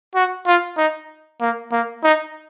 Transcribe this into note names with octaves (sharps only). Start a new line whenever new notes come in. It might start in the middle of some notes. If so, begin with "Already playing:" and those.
F#4
F4
D#4
A#3
A#3
D#4